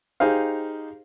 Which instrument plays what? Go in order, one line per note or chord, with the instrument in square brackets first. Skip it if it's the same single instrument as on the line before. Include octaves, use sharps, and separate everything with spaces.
[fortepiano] D#4 G4 G#4 C5 F5